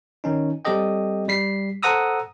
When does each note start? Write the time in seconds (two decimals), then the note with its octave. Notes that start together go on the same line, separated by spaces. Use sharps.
0.24 D#3 C#4 D#4
0.65 G3 C4 G4 A4 D#5 G5
1.28 G3 B6 C7
1.83 A4 C5 F#5 A#5 D#6 E6